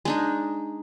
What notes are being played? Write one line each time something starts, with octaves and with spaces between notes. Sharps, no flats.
G#3 D4 D#4